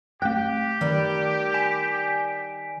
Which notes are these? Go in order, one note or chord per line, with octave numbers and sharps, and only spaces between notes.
A3 G4 G5 F#6
D#3 G3 D4 B4
G#5 B6 D7